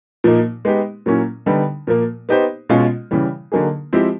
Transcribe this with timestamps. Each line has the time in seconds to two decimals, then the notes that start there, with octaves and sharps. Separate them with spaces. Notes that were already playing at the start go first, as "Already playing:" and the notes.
0.24 A#2 F3 A#3 D#4
0.65 G#3 B3 D#4 G4
1.06 A#2 F#3 A#3 C#4 E4
1.46 D3 G3 B3 D#4
1.87 A#2 F3 A#3
2.29 B3 D#4 G4 C5
2.69 B2 G#3 C#4 F4
3.11 C#3 E3 G3
3.52 D3 F#3 A#3 D#4 G#4
3.93 F3 G#3 C4 E4 G4